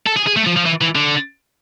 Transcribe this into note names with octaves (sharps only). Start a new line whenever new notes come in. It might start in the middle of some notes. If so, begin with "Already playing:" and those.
A4
G#4
G#4
A3
F3
F3
E3
E3
D3